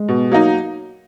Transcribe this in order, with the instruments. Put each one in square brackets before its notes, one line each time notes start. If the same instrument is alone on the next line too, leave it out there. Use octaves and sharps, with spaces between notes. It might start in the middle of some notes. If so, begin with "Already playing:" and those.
Already playing: [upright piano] G#3
[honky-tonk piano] B2
F#3 A#3 D#4